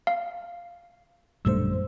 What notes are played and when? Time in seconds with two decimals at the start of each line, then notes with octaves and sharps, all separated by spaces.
0.07 F5
1.45 A1 F#2 A#2 D3 G3 A3 C5 E6